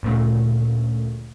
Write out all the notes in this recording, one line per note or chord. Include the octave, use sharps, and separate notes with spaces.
D2 A#2 C#3 A3